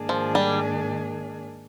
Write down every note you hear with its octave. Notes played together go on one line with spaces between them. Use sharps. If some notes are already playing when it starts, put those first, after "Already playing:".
Already playing: G#2 D#3 A#3 D4 G#4
F3
G3